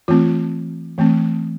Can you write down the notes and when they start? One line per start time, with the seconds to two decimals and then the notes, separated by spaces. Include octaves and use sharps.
0.08 E3 A3 C4 F4
0.98 E3 A3 C4